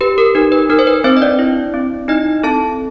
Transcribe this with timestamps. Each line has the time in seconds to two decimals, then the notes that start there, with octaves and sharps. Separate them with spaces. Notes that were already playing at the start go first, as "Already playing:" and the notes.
0.01 G4 B4
0.18 A#4
0.35 D#4 A#4
0.52 B4
0.70 D#4 A#4
0.79 C5
0.87 B4
1.04 C4 C5
1.17 D#5
1.22 D4 D5
1.39 E4
1.74 C4
2.08 D#4 E4 D#5
2.43 C4 A4 A5